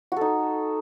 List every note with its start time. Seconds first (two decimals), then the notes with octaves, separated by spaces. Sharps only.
0.12 F#4
0.16 A4
0.21 D#4